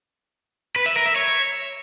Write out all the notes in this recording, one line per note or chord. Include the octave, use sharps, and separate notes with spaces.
B4
E5
A#4
E5
C#5